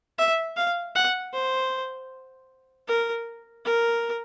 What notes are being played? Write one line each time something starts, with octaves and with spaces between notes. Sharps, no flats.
E5
F5
F#5
C5
A#4
A#4